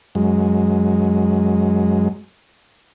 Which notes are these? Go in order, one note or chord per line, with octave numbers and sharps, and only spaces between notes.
F#2 G#3